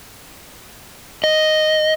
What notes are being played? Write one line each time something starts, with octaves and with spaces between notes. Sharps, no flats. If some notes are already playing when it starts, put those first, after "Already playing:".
D#5